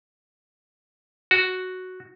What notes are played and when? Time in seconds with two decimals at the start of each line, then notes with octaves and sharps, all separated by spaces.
1.31 F#4